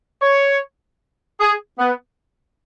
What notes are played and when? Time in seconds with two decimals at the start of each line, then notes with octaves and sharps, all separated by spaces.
0.22 C#5
1.40 G#4
1.79 B3